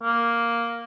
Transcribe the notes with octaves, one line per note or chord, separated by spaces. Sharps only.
A#3